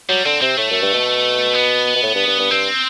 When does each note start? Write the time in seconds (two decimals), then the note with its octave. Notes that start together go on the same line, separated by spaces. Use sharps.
0.09 F#3 G3
0.25 D3 C4
0.42 C3 C4
0.57 A2 A3
0.70 F#2
0.82 G2
0.94 B2
1.54 B3
1.96 B2
2.03 A2
2.15 G2
2.27 G2
2.39 G2
2.51 G2 C4